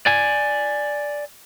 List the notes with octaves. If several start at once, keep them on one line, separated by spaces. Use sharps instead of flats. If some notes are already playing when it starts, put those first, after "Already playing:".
D5 G#5